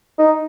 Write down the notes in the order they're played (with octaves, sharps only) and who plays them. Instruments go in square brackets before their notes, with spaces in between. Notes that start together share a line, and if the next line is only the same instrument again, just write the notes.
[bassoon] D#4